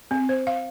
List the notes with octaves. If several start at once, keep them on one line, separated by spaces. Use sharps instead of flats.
C4
C5
F5